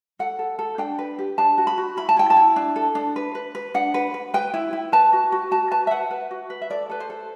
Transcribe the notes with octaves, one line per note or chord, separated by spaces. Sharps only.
A4 F#5
A4
A4
D4 G5
B4
G4
D4 A5
F#4
B5
F#4
E4 B5
A5
E4 G5
A5
E4
D4
A4
D4
B4
B4
B4
D4 F#5
B4
B4
B4 G5
E4
E4
B4 A5
F#4
F#4
F#4 A5
B4 A5
E5
B4 F#5
B4
F#4
B4
E5
A4 D5
A4 B4
C5
A4